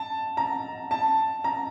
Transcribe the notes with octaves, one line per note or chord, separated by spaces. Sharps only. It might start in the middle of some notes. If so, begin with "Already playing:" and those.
Already playing: A5
A#5
A5
A#5